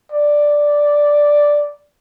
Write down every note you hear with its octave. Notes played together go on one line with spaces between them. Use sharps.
D5